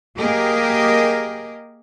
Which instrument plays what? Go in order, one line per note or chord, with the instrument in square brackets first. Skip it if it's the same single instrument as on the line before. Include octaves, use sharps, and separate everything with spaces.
[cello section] A#3 G4 G#4 A#4 D#5